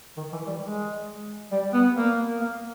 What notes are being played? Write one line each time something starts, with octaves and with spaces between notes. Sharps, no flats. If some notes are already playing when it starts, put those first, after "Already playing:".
D#3
E3
G3
G#3
G3
B3
A#3
A#3